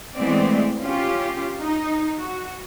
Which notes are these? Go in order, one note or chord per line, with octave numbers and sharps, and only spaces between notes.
E3 G#3 A3 B3 C4 D5
C#4 F4 G4
D#4
F#4